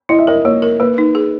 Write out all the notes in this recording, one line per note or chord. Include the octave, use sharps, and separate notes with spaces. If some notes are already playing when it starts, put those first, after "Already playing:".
E4 D#5
E5
A#4 D#5
A#3 C#5
A#4
A#3 B4
D#4
G#4